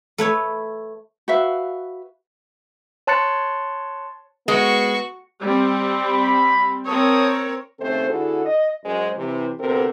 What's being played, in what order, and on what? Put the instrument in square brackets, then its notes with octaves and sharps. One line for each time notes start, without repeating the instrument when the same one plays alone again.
[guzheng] A3 B4 C#5 E5
[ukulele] F#4 B4 E5 F5
[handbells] C#5 A5 C6 F#6 A6 C#7
[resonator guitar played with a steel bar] G#3 [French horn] B3 [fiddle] F#4 C#6
[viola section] G3 C4
[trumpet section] B5
[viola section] C4 A#4 C#5 [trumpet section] A5 D#6
[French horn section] D#2 C#3 A3 C4 A4 C5
D3 E4 F#4 G#4 A4
D#5
F#2 G#3 C5
C3 E3
D2 C3 B3 C4 A4 A#4